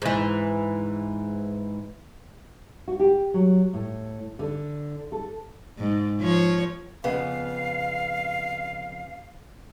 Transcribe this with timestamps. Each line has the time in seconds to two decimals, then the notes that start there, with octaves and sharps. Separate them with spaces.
0.02 G#2 E3
2.88 F#4
3.00 G4
3.34 F#3
3.74 A2
4.39 D3
5.12 A4
5.79 G#2
6.20 F3 C#5
7.04 F2 C#3 B3 F5